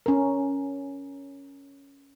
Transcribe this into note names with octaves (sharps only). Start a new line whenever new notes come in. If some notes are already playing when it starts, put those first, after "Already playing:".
C#4 A#4